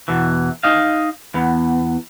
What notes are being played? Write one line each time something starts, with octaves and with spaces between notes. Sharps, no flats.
E2 B2 E3
D#4 D#5 F5
E2 B3